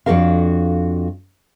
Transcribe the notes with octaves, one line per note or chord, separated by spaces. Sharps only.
F2 D4 F#4 A4 A#4 F5